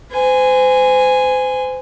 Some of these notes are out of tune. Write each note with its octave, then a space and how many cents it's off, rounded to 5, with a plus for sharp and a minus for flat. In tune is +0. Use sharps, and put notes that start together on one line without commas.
C5 -35 G#5 -5